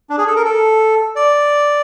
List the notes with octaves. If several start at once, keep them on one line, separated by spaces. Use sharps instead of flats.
D4
G#4
A4
A#4
A4
D5